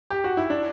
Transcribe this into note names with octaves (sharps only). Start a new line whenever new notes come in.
G4
F#4
E4
D4